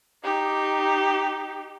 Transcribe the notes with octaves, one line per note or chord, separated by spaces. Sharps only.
D#4 G4